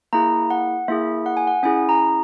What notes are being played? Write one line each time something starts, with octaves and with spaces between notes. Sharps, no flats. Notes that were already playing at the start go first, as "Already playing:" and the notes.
A#3 E4 G#4 A#5
F#5
A#3 E4 G#4 E5
F#5
G#5
F#5
C#4 E4 G#4 G#5
A#5